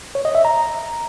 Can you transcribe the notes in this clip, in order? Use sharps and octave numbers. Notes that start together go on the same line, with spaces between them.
C#5
D#5
E5
A#5